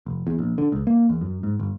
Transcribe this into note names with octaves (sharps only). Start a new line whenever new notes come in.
F1
E2
A#1
D3
C#2
A#3
E2
F#2
G#2
G1